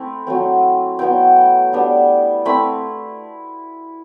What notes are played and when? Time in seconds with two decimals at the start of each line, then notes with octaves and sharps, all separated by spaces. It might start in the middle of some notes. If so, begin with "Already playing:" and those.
Already playing: A3 C4 E4
0.27 F#3 A3 C4
0.99 F#3 B3 E4 G5
1.73 G3 B3 D4
2.45 A3 C4 E4 B5